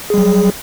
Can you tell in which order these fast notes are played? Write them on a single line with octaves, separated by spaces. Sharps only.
G#4 G3 F#3